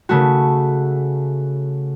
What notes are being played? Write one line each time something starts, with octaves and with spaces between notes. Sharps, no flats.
C#3 A3 F#4